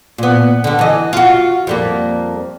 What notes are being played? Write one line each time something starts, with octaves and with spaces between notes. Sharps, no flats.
A#2 B3
D3 G3
E3 D#5
F4 F#4
F2 G3 A#3